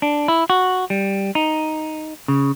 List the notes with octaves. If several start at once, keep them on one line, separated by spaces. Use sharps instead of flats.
D4
E4
F#4
G3
D#4
C#3